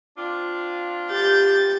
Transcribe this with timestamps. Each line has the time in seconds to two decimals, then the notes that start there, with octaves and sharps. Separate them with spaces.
0.18 C4 D4 F4
1.10 G4 G6 A6